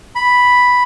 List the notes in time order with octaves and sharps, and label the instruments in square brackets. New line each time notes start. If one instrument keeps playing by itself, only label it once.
[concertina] B5